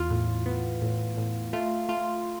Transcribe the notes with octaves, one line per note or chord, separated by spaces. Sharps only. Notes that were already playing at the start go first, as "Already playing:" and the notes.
Already playing: E2 F4
A2
B3
A2
A2
A3 F4
A3 F4